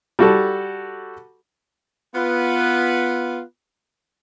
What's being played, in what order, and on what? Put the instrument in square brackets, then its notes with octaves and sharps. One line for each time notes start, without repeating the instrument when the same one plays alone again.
[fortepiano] G3 F#4 A4
[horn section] B3 F4 B4